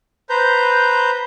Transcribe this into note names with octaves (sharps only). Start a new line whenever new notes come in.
B4 C5 A#5 G6